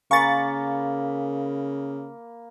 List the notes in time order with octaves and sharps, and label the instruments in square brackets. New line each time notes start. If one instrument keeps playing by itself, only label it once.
[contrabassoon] C#3 [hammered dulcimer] A#3 B5 [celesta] F5 G#5 A#5 [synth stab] C#6 A6